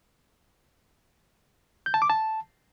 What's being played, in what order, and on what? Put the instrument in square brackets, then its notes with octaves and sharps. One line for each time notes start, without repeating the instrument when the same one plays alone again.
[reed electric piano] G6
A5
D6
A5